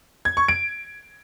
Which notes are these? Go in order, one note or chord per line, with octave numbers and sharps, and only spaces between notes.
G#6
C#6
D7